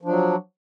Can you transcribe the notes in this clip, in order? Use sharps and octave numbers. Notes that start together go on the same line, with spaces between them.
F3 F#3 D4